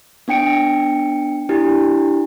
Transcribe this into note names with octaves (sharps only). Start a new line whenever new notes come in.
B3 D4 G5 C#7 D7
D4 E4 G4